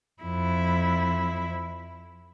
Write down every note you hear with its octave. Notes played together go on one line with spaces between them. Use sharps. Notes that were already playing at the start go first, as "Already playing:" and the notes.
F2 E4